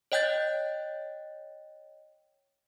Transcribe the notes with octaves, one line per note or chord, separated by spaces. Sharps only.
C#5 D#5 G5 F#6 G6 A6